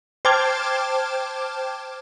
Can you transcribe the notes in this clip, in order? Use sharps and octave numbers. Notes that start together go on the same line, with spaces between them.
C5 G5 A5 D6 F6 G#6